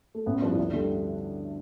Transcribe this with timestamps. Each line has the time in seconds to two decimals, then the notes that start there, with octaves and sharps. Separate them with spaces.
0.15 A3
0.26 A1 B3
0.42 G2 F3 D4
0.51 E4
0.57 D2 D4
0.73 D3 G3